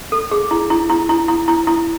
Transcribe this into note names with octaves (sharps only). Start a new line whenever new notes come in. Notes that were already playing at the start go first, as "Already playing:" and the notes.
A4
G#4
E4
E4
E4
E4
E4
E4
E4